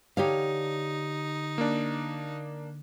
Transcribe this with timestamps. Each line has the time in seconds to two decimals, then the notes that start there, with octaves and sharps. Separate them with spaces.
0.17 D3 D#4 G4 C#5 F5
1.58 A#3 D4